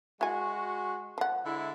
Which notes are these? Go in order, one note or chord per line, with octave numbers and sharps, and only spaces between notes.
G#3 E4 F#4 G#5
F3 F#5
D3 G#3 E4